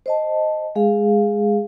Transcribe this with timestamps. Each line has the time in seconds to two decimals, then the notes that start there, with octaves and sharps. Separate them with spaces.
0.06 C5 D#5 A5
0.75 G#3 G#4 F5